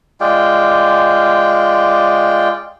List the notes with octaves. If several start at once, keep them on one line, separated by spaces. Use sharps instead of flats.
G#3 F4 D5 G5